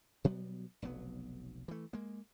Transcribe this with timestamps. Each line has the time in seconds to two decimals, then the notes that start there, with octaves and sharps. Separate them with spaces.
0.24 B2 F#3 G3 B3
0.82 F1 B1 F#3 B3
1.68 E3 A3
1.93 G#3 A#3